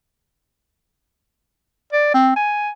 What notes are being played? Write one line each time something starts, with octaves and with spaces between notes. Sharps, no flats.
D5
C4
G#5